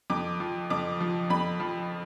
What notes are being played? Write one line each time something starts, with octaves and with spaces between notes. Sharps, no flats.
F2 D6
F3
F2 D6
F3
F2 B5
F3